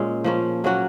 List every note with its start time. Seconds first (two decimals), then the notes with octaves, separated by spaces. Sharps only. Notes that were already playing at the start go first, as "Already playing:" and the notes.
Already playing: A#2 G#3 C#4 G#4
0.24 F3 A#3 C#4
0.64 F#3 A#3 C#4 F#4